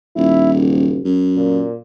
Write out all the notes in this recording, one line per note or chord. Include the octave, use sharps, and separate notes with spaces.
D#1 E4
F#1
F#2
A#2